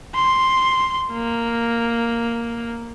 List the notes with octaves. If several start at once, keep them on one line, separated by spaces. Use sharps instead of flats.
C6
A#3